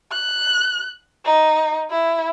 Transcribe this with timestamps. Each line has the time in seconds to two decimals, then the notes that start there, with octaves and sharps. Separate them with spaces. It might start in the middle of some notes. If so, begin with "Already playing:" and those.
0.12 F#6
1.26 D#4
1.91 E4